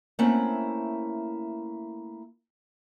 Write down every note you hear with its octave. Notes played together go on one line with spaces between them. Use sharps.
A3 A#3 C4 C#4 E4 F#5